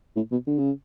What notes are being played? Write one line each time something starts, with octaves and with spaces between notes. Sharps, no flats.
A2
B2
D3
C#3